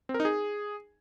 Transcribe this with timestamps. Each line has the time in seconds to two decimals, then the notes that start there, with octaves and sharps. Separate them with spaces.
0.09 C4
0.14 A#4
0.20 D#4
0.25 G#4